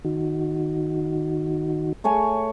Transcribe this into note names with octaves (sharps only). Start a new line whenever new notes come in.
D#3 D#4 F#4
A3 C#5 G#5